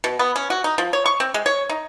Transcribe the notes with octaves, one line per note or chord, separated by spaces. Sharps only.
B2
B3
C#4
F#4
D#4
F3
C#5
C#6
C4
G#3
C#5
D#4